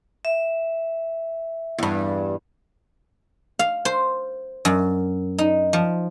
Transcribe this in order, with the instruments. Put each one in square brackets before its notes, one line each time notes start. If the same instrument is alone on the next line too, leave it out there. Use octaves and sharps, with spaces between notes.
[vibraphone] E5
[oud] E2 G2
[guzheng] F5
C5
F#2
D#4
F3